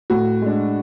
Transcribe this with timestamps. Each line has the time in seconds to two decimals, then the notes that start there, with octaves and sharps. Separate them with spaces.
0.10 A2 F#4
0.42 G#3 D4